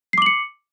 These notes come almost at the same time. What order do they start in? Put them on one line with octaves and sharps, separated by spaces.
C7 D6 F#7 C#7